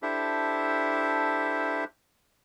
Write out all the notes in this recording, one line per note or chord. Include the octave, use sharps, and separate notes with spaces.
D4 E4 G4 A4 C5 E5